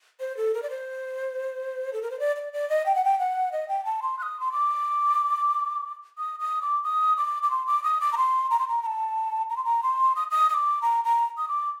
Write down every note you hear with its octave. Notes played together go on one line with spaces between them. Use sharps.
C5
A4
A#4
D5
C5
A4
A#4
C5
D5
D5
D5
D#5
G5
F#5
G5
F#5
D#5
G5
A5
C6
F#6
D#6
C6
D6
D#6
D#6
D6
D#6
D6
D6
C6
D6
D#6
D6
A#5
C6
A#5
C6
A#5
A#5
A5
A#5
C6
A#5
C6
D#6
D#6
D#6
D6
A#5
A#5
D#6
D6